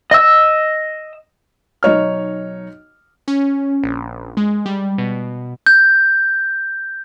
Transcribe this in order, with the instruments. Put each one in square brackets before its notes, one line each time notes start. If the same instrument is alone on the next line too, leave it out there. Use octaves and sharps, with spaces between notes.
[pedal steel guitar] D#5 E6
[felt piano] B1 D#4 C#5 F6
[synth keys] C#4
A#1
G#3
G3
B2
[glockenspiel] G6